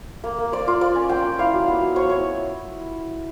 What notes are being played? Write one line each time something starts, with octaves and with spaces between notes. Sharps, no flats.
A#3
A#3
A#3 D5
F4
F4 D5
C#4
A#3 G5
F4
E4 F5
F#3
B3
F#3
F#3 C#5
E4 C#5